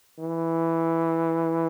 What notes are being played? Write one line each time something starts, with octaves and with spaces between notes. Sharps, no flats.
E3